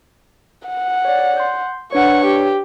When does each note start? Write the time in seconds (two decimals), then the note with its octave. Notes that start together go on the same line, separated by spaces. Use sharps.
0.68 F#5
1.05 C#5 D5
1.37 C6 G6
1.93 D4 B4 C#5 F#5 C#6
2.26 G4